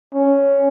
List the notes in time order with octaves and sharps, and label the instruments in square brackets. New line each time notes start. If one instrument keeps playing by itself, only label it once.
[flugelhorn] C#4